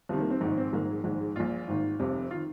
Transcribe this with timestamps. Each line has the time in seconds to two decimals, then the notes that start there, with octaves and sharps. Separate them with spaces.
0.09 C2 C3 D#3 F3
0.21 A#3
0.30 C4
0.41 A#1 G#2 D#3 D#4
0.57 C4
0.73 A#1 G#2 D#3 A#3
0.89 G#3
1.04 A#1 G#2 D#3 G#3
1.21 G#3
1.36 A#1 A#2 F4
1.68 G#1 G#2 D#3
2.00 F1 F2 C3
2.31 D#3 F4